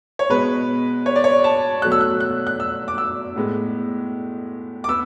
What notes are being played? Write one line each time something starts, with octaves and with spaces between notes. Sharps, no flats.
C#5
B2 G#3 B3 B4
C#5
D5
C#5
A5
B2 F#3 A3 F#6
E6
F#6
F#6
F#6
E6
D6
E6
A2 G#3 B3
D6
B3 E6